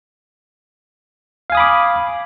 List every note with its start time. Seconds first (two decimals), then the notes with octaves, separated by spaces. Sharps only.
1.50 F5
1.52 G#5
1.55 D#6
1.57 B5
1.60 D6